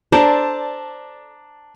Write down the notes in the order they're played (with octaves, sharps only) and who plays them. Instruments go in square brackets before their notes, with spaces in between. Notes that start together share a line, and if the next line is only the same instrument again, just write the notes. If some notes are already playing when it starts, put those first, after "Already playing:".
[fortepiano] D4 A5 A#5 [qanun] A4 C5 D5